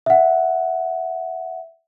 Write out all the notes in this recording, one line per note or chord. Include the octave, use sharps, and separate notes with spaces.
E5 F#5